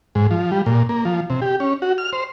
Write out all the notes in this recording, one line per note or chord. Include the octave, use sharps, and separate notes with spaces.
G#2
F3
G3
A#2
A#3
F3
C3
G4
C#4
F#4
F6
C5